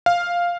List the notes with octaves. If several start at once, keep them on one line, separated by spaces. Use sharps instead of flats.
F5